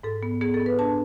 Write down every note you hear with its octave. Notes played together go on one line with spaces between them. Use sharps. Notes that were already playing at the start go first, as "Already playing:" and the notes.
G#2 A4
B3
B3 G#4
A4
B3
B4
D4 A5